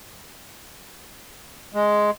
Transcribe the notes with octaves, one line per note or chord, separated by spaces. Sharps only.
G#3